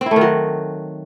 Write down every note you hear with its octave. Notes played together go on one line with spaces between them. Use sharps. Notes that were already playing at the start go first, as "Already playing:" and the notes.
C4
E4
A3
D#3
F#3